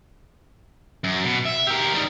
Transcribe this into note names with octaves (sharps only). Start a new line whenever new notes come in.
F#2
B2
E5
G4 A#4
G3 D#4